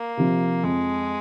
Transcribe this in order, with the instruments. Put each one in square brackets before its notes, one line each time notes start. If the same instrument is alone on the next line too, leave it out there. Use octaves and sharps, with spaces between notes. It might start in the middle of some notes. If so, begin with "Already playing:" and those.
Already playing: [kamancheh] A#3
[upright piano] C3 F3
[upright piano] F2 [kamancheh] G#3